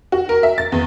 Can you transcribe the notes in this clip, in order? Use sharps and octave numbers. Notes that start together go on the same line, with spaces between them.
F#4
A#4
E5
A6
E2